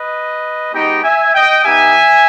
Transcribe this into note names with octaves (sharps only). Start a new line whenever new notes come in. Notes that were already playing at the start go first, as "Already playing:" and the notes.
Already playing: B4 D#5
G#3 B3 D#4 G4 D#5 G5
E5 G#5
D#5 G5
B3 D#4 G4 E5 G#5